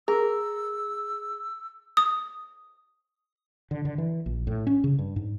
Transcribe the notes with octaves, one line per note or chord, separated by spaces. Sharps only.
G#4 A#4 E6
D#6
D3
D3
E3
A#1
A2
C#4
C#3
G2
G#2